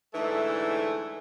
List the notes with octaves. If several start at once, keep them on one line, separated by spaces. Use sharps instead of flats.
G#2 D3 E3 A3